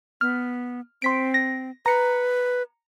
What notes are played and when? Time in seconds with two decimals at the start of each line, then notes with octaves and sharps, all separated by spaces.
0.21 B3 F6
1.02 C4 C6 B6 D7
1.34 A#6
1.86 B4 A#5 C#7